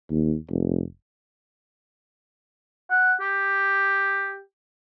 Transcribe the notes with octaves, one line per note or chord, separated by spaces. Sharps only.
D#2
F1
F#5
G4